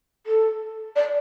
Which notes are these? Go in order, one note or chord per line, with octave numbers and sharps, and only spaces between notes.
A4
D5